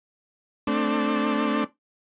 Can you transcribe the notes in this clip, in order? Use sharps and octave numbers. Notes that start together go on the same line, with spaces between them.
A3 C4 D4